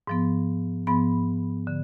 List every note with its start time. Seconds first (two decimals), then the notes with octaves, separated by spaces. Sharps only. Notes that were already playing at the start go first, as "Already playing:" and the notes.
0.07 G#2 F3 B3
0.87 G#2 F3 B3 B5
1.67 D3